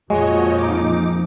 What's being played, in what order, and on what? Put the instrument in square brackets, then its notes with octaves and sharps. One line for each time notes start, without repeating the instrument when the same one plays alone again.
[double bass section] F2 A#2 F3 [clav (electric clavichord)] G#3 [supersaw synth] F#4 C#5 D#5
[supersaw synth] D#4 D6